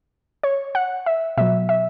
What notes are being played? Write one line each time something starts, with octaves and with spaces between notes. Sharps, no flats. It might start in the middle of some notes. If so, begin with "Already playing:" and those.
C#5
F#5
E5
B2 F#3 E5
E5